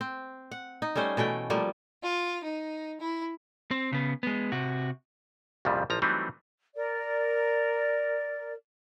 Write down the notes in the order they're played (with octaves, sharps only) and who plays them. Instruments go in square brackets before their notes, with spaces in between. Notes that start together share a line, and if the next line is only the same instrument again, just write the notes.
[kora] C4
F#5
D#4
G3 A3 C#4 C5
B2 E3 A3 G5
F3 G3 A3 A#3
[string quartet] F4
D#4
E4
[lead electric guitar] C4
C#3 B3
G#3 B3
C3 F#4
[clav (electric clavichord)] C2 F2 A#2 C#3 F3 G3
A1 F3 A#5
E3 F#3 G3 A3 C4 D#4
[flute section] A#4 D5